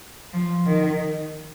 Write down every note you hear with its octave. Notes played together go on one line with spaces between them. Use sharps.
F3
D#3